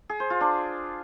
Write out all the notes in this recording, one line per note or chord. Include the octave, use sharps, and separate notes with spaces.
G#4
C5
F4
D4